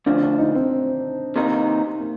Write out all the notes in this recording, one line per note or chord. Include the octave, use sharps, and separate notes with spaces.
D2 D3 F3 D4
D4
D#4
C4
C3 D#3 A#3 D#4
A#3